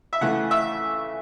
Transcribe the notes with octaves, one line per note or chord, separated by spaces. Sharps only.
E5
C#3 E3 A3 F#5
E5